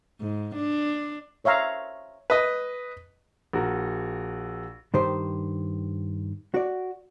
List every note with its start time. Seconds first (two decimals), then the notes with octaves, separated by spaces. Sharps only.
0.21 G#2
0.55 D4
1.44 C5 C#5 E5 F5 A#5
2.30 B4 D#5
3.53 A#1 F#4 A#4
4.94 G2 D#3 G4 C5
6.54 F#4 D5